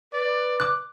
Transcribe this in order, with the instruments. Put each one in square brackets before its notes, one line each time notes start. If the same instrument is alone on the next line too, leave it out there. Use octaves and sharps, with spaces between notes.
[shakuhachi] B4 [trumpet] D5
[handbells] D6 F#6